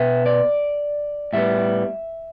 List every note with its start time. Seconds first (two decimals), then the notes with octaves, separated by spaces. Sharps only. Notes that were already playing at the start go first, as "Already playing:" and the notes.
Already playing: B2 B3 E5
0.26 D5
1.33 A2 G3 B3 E5